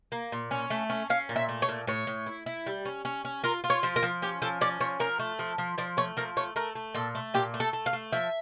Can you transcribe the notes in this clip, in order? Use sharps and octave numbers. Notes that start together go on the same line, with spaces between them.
A#3
A#2
C#4
A3
C#4
C#4 F5
A#2
E5
A3
C#5
A#2
A2 C#5
A2
E4
E4
G3
C#4
C#4
C#4
F4 A#4
F4
C#5
F3
A#4
F3
C#4 G4
F3 A4
C#4 D5
F3 C#5
F3 A#4
A3
F3
F3
F3 D5
A3 C#5
F3 A#4
A3 C#5
A3 A#4
A3
A#2 A4
A3
A#2 G4
A3
A4
A3
F5
A3
F3 E5